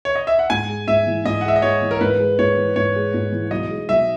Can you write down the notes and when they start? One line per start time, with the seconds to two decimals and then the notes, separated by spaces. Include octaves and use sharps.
0.05 C#5
0.16 D#5
0.27 E5
0.39 F#5
0.50 G#2 G#5
0.69 G#3
0.87 G#2 E5
1.06 E3
1.25 G#2 D#5
1.41 F#5
1.45 G#3 E5
1.56 D#5
1.62 G#2 C#5
1.82 E3
1.91 A#4
2.01 G#2 B4
2.19 G#3
2.39 G#2 C#5
2.57 E3
2.76 G#2 C#5
2.95 G#3
3.14 G#2
3.32 E3
3.51 B1 D#5
3.70 G#3
3.89 B1 E5